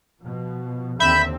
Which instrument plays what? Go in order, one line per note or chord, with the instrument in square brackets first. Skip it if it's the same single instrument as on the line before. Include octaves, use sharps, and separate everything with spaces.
[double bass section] B2 F3
[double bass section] D#2 D3 C4 [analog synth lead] E5 [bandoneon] B5 G6